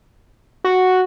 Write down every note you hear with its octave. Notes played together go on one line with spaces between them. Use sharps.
F#4